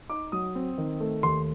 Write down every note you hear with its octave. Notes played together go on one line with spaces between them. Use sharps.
D#4 D6
F#3 D#6
C4
D#3
A3
D#2 C6